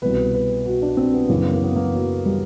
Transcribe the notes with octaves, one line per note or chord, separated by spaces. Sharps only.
C2 B2 B4
B4
F#4
D4
C4
B3
F#2 C#3 E3 A#3
B3
A#3
B3
A#3
F#3
G3